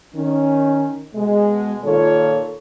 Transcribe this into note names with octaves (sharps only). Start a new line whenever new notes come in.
D#3 C#4
B2 G#3
A#2 D#3 F4 A4 C#5